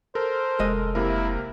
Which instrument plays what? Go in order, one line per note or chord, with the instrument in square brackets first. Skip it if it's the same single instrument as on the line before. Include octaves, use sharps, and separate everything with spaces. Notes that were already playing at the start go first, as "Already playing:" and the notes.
[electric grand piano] A4 A#4 [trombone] C5
[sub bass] F1 [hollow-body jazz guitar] G#3 D#5
[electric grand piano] C3 A#3 A#4 [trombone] E4